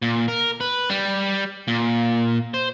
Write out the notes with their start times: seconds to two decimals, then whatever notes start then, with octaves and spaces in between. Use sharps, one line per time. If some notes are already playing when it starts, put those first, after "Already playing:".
0.02 A#2
0.28 A#4
0.60 B4
0.90 G3
1.68 A#2
2.54 C5